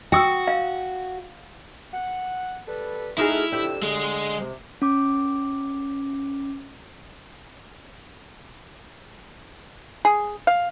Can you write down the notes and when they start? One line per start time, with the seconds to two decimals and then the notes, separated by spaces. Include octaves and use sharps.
0.12 F#4 G5 D#6 E6
0.47 F5
1.93 F#5
2.68 G3 A4 B4
3.18 A3 D#4 E4 F#4 G#4 F6
3.52 F2 D3 G4 E6
3.82 D3 G#3
4.40 C3
4.82 C#4 D6
10.05 G#4
10.47 F5